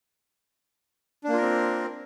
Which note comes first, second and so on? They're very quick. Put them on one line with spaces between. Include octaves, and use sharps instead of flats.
D4 A#3 F4 A#4 C4